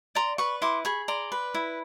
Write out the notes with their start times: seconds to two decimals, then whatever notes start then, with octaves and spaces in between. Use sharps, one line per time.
0.15 D5 A#5 C6
0.38 B4 B5 C#6
0.62 E4 C6 D6
0.85 G#4 B5 C#6
1.08 D5 A#5 C6
1.32 B4
1.54 E4